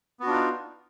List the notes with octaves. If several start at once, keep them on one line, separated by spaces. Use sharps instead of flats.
B3 D4 D#4 F4 F#4